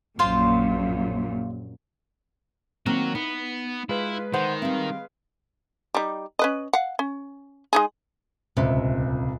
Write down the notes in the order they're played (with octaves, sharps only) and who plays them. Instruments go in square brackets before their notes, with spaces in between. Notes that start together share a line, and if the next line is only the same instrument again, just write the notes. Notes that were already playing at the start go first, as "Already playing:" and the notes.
[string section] A#1 F#2 A#2 [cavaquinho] F4 C5 F5
[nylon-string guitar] D#3 A#3 C4 [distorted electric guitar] F#3 F#4
[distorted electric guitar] B3 [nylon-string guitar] D#4
[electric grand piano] G#3 B4 [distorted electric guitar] E4 [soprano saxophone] F4
[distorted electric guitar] D#3 [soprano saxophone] C5 [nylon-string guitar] F#5
[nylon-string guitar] G3 C4 [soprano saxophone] F5
[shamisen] G3 D#4
C#4 B4 D#5
F5 F#5
C#4
G#3 D#4 G#4
[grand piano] D#1 C#2 E5 [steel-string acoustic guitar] C3